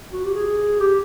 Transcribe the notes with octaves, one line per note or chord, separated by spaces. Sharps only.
F#4
G4
G#4
G4